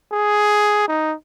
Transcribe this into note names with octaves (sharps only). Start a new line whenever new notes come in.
G#4
D#4